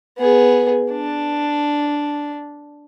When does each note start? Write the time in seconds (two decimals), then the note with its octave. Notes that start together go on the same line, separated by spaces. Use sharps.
0.18 B3 G#4
0.91 D4